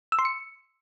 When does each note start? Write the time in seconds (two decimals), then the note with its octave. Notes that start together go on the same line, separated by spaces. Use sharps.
0.12 E6
0.19 C6
0.25 C#7